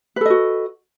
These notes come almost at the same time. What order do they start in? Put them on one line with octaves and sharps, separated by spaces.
B4 A4 D#5 F#4